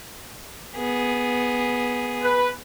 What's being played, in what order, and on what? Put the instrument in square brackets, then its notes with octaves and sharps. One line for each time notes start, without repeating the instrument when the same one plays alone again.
[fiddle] B3 G#4
[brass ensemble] B4